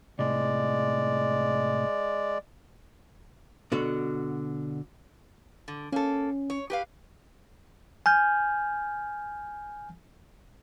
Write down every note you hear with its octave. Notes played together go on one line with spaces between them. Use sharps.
A2 C3 G#3 D5
B2 D3 F#4
D3
A#3 C#4 A4
C#5
G4 B4 F5
G#5 F6 G6